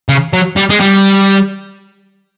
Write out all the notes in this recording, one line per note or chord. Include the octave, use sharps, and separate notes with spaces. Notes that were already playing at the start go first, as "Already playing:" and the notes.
C#3
F#3
G3
G#3
G3